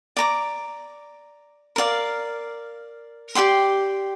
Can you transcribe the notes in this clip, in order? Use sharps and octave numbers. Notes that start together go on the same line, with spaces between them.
D5 A#5 D6
A#4 D5 F5
G4 D5 G5 C6